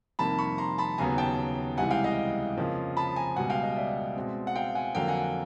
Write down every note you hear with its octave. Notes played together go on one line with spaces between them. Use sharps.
F2 C3 D#3 G3 A#3 A5 B5
B5 C#6
A#5 C6
A5 B5
D#2 C#3 F#3 B3 G#5 A#5
G5 A5
C#2 C3 E3 G3 F#5 G#5
F5 G5
D#5 F5
F2 C#3 F3 A#3
A5 B5
G#5 A#5
C#2 B2 G3 F#5 G#5
F5 G5
D#5
D5 E5
B2 G#3 C4
F#5
F5 G5
F#5 G#5
F2 D3 F#3 A#3 F5 G5
F#5 G#5